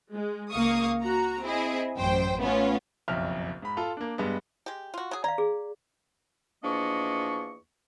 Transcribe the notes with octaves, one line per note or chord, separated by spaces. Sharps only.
G#3
C#2 A#3 F5 C#6 D#6
F#4 A#5
C4 E4 G#4 D#5
A1 F#2 C5 G5
A3 B3 C#4 F4
F#1 B1 F2 E5 F6
G#2 B5
F4 A4
A#3 D4
G2 G#3 B3
G#3 G4
F4 F#4
F#3 G#4
D5 F5 A#5
G#4
E2 F3 A#3 D4 D#5 C#6